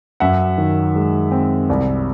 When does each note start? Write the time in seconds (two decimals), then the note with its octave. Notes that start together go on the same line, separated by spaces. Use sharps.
0.20 F#2 E5 F#5
0.58 D#3
0.95 G#3
1.31 C4
1.69 C2